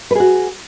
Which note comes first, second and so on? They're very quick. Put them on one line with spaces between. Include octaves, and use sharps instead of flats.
B4 G#4 F#4